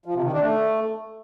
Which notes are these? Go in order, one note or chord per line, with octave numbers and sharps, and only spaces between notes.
F3
C3
D#3
D4
A3